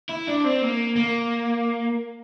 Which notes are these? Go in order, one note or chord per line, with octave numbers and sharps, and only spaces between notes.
E4
D4
C4
A#3
A#3